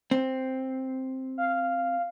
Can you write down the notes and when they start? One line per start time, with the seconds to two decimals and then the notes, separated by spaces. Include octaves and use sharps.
0.11 C4
1.38 F5